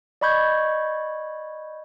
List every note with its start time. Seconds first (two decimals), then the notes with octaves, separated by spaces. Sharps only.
0.21 D5 D#5 B5 C#6 G6 G#6